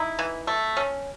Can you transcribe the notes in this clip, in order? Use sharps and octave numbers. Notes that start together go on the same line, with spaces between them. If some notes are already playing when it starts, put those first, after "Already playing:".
Already playing: D#4 E4
E3
A3
C#4